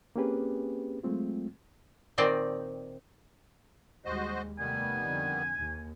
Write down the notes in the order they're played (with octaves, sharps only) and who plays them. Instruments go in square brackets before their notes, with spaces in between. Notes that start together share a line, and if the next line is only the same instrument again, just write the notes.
[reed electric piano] A#3 C4 C#4 G4 G#4 B4
F#3 G#3 A3 C4 F4
[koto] A#2 D#3 C4 D5 D#5
[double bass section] D#2 G3 G#3 [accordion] F#4 C5 D#5
[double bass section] F1 A3 [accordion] D#3 G3 B3 [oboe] G#5
[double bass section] F2 D3
D#2